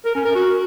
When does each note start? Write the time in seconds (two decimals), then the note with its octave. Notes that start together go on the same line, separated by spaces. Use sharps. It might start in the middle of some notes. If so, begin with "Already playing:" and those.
0.05 A#4
0.15 C#4
0.25 A#4
0.35 F#4